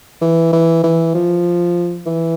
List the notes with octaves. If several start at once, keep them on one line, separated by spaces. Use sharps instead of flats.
E3
E3
E3
F3
E3